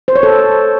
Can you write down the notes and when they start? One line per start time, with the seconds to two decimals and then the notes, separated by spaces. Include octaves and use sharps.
0.08 C5
0.16 C#5
0.23 A4